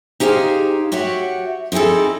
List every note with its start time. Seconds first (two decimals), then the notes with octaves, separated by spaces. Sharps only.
0.20 D#4 G4 G#4 C5 F5
0.92 F#4 G4 C#5 E5 F#5
1.72 C4 D#4 E4 G#4 A4